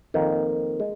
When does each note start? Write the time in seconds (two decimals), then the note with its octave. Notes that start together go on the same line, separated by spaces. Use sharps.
0.14 F2 D#3 A#3
0.80 G#3